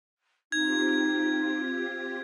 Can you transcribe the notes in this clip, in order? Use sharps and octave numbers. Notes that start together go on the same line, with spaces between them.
C4 D#4 F4 G4 G#6